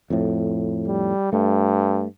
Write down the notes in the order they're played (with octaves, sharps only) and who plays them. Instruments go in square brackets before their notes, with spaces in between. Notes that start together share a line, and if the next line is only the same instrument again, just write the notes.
[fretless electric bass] F2 A2
[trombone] G3
[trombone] G2 [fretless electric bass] A3